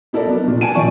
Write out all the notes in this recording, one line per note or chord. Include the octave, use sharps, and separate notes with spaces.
D#4 E4 A4 A#4 D5
F#3 B3
A#2 D4
G#5 A5 D7 D#7
A#2 D#3 D5 C#6